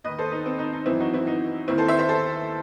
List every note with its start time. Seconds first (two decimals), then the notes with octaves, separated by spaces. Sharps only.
0.04 D#2 D#3 B4 D#5
0.18 A4 C5
0.31 D#4
0.46 C4
0.59 D#4
0.73 D#4
0.86 F#2 E3 C4 E4
1.00 D#4 F#4
1.13 C4 E4
1.27 D#4
1.68 D#2 D#3 C4 E4
1.78 A4 C5
1.88 C5 E5
1.99 C5 E5
2.09 A4 C5